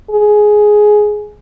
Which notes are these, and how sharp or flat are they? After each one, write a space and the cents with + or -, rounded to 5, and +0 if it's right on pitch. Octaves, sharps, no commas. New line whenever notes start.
G#4 +10